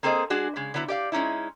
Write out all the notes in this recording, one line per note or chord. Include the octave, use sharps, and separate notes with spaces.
A#3 C4 G#4 A4 C5 D#5
G#3 D4 F#4 G#4
C#3 G#3
D3 F#3 B3 E4
G4 D5 F5
G#3 C#4 D#4 E4